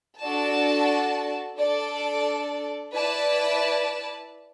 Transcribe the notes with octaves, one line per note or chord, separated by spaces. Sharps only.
D4 F#4 A4 D5 A5
D4 A4 D5
E4 B4 D5 A5